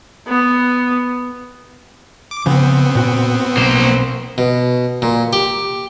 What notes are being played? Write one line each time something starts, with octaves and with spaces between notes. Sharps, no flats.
B3
D6
C#3 F3 B3 C4
A#2 F#4 G5
B1 A#3 C5
B2
A#2
G4